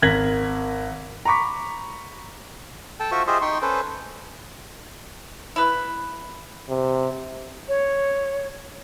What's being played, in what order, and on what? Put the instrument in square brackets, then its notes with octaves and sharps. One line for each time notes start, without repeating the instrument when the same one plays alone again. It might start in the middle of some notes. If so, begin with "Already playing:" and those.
[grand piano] G#1 A#4 G#6 A#6 B6 F#7
A#5 B5 C#6 D6 B6
[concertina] A4 G5 A5
F4 F#4 C5 E5 C#6
F4 G4 G#4 C5 D#5 E5
D#4 G5 C6 C#6
C#4 A4 B4 C5
[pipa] E4 B4
[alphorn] C3
[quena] C#5